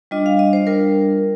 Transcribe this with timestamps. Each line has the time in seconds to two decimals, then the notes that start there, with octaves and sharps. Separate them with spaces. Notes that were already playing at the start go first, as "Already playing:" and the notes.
0.11 G3 D4 F4 D#5
0.26 F5
0.39 D#5
0.53 C5
0.67 G3 D4 F4 A#4